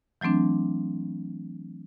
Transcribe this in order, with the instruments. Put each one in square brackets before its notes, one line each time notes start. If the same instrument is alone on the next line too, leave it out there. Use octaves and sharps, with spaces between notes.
[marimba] E3 F#3 A3 C4 D4